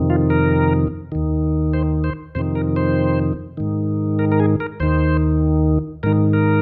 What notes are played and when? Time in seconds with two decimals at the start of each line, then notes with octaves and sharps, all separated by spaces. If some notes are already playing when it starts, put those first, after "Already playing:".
Already playing: F2 C3 D#3
0.10 F4
0.30 A#4
1.12 D#2 D#3
1.74 C5
2.04 C5
2.35 F2 C3 D#3 C5
2.55 A#4
2.76 C5
3.57 G#2 D#3
4.19 A#4
4.32 A#4
4.40 G#4
4.60 A#4
4.80 D#2 D#3 C5
6.03 G#2 D#3 A#4
6.33 A#4